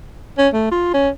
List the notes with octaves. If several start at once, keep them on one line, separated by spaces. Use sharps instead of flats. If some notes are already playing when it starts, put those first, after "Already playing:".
C#4
A3
F4
C#4